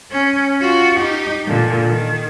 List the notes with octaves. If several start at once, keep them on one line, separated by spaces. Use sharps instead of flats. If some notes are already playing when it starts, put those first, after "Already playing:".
C#4
F4 F#4
D#4 G4
A#2 D3
D#3